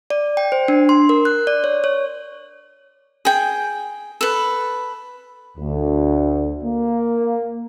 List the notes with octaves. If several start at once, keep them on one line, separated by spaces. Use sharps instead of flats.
D5
G5
C5
D4
C6
A#4
F#6
D5
C#5
C#5
G#4 G5
A4 B4
D2
A#3